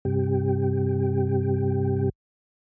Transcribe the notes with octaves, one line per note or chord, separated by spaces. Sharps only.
G2 C3 G4